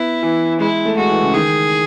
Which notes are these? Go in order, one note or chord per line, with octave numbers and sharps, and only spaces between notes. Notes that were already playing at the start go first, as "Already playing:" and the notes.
Already playing: B3 E4
E3
G#3 E4
A3
G#3 F#4
E3
C#3
D#3 G#4